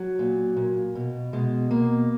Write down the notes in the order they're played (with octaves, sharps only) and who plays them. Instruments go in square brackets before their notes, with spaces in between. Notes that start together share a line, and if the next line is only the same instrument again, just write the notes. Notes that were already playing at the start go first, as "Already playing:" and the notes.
Already playing: [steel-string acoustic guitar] F#3
A#2
A#2
B2
B2 G#3
B2 A#3